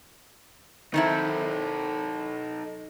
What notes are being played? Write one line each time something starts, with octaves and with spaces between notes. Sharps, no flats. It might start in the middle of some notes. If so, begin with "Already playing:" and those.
D#3 C4 D#4 E4 A4